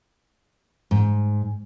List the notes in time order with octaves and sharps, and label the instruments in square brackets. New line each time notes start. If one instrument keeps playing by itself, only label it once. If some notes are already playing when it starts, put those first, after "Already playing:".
[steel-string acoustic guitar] G#2